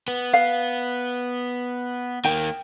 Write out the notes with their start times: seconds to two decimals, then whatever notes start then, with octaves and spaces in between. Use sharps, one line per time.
0.08 B3
0.33 F5
2.25 D#3 A#3 G5